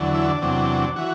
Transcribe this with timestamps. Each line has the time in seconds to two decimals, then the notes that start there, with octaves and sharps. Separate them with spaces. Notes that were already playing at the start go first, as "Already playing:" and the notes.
Already playing: E2 D3 F#3
0.14 E4
0.28 D4
0.42 E2 C3 F#3
0.96 E3 F#4